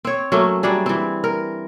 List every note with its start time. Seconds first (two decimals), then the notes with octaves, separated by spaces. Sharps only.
0.05 C4 C#5
0.32 F#3 A3 A#3 C#4
0.63 F#3 G3 D4 G#4
0.86 E3 C4
1.24 A#4